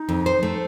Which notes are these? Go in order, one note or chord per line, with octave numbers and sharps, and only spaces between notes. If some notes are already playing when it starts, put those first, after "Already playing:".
Already playing: D#4
F2
C5
A3